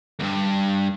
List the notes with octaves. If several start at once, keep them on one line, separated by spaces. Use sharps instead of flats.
D2 G2